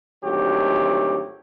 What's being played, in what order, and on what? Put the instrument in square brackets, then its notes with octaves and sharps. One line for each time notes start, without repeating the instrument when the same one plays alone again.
[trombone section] G#1 D2 F#3 G4